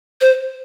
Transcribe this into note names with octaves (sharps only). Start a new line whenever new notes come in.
C5